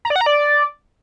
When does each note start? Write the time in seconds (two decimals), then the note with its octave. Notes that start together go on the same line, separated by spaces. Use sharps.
0.05 A#5
0.10 D5
0.16 F#5
0.21 A#5
0.26 D5